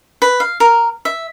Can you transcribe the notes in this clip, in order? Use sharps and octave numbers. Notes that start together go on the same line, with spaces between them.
B4
F5
A#4
E5